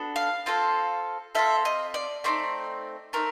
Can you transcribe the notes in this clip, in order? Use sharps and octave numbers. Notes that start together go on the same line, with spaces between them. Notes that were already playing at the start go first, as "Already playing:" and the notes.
Already playing: B3 D4 F#4 A4
F5
C4 F4 A4
C4 F4 A4 E5
D#5
D5
A3 C4 D#4 D5
A3 C4 D#4 A#4